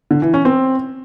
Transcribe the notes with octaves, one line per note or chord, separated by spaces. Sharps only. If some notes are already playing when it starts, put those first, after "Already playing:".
D3
E3
C#4
C4